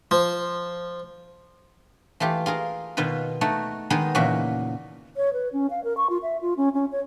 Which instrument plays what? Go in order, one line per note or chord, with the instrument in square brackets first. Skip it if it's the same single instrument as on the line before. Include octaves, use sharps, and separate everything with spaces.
[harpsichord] F3
[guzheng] E3 A3 F4 G4
F4 G#4 A#4
B2 D#3 F4 B4
A3 D#4 F#4 A4
D#3 G#3 B3 D#4 G#4
E2 A#2 C#3 F#4 E5 A#5
[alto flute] C#5
B4
C#4
F5
A#4
C#6
F4
E5
F4
C#4
C#4
C#5